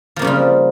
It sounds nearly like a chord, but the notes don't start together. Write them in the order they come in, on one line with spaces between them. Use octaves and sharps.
F3 A#3 C#3 G3 F4